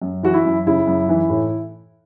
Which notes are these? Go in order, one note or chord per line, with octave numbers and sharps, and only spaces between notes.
F#2
E3 F#4
E4
F#2
C#3 E4
F#2
E3
A2